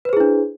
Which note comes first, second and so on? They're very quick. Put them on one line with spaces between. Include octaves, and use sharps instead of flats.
B4 C5 G#4 E4 D4